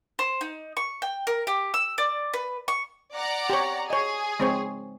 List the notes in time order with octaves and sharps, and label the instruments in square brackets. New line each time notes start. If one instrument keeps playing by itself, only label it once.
[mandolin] C5
D#4
C#6
G5
A#4
G4
E6
D5
B4
C#6
[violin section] D5 F#5 A#5
[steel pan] G4 C#5
[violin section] G#4 [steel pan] C#5 D#5
[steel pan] G#3 C4 C#5